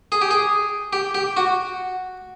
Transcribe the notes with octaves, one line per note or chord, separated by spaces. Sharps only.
G#4
G4
G#4
G4
G4
F#4